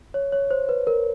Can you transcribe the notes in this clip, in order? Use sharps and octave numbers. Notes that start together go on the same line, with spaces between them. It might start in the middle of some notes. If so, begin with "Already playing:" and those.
C#5
C#5
C5
B4
A#4